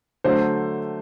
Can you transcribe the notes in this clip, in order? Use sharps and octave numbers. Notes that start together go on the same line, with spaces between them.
D3 F#3 A3 C5